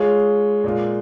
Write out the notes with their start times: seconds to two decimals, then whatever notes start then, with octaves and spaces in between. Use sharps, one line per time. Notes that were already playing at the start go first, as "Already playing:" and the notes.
Already playing: G#3 F4 G#4 C#5
0.64 A#2 G#3 F4